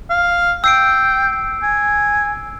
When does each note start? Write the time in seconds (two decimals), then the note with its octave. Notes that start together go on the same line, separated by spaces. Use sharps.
0.10 F5
0.64 G5 E6 C7 D7
1.63 G#5